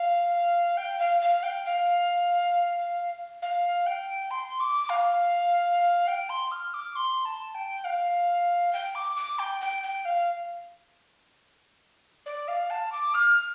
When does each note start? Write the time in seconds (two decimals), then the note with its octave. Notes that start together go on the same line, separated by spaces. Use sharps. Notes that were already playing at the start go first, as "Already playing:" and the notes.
Already playing: F5
0.77 G5
0.99 F5
1.21 F5
1.43 G5
1.65 F5
3.42 F5
3.86 G5
4.30 C6
4.60 D6
4.89 F5
6.07 G5
6.29 C6
6.51 F6
6.74 D6
6.95 C6
7.25 A5
7.54 G5
7.84 F5
8.73 G5
8.95 D6
9.16 D6
9.39 G5
9.61 G5
9.83 G5
10.05 F5
12.26 D5
12.48 F5
12.70 A5
12.92 D6
13.14 F6